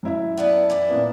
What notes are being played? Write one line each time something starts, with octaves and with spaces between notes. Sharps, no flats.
F#2 E4 E5
B3 D4 B4
E3 D4 E4
A#2 A#3 B3